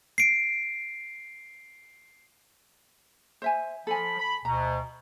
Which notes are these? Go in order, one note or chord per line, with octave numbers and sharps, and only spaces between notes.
C7 D7
C5 E5 G#5
F3 A4 G#5 B5
B5
D2 B2 A#5